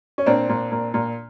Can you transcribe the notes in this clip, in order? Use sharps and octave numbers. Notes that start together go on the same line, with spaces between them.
C#4
A#2 C4 D4
A#2
A#2
A#2